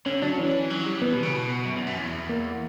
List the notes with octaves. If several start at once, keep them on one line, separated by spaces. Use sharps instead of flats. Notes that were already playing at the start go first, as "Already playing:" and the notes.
D3 C#4
F#3 D4
E3 C#4
F#3
G3
E3 B3
B2
C#3
B2
F#2
E2
F#2
E2
A#3